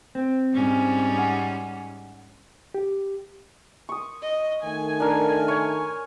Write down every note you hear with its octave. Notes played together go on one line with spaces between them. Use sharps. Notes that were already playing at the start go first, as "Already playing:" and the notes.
C4
G#2 G3 C#4
F#5
G4
C#6 D#6
D#5
D#3 A3 G#5
D4 A#4
C#5 C#6